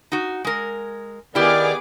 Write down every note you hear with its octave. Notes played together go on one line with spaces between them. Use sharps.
D#4 F#4
G#3 A#4
D#3 B3 E4 G4 G#4 D5 D6 F6